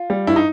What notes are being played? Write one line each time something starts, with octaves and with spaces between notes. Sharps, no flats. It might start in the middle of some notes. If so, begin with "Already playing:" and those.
Already playing: F4
G3
G2 E4
D#4